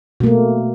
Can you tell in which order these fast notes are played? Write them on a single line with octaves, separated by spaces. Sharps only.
B2 A#3 A3